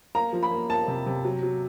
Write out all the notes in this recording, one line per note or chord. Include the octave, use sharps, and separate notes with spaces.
A#3 A#5
F3
B5
A#3
A#3 A5
C3
C3
F#3
F#3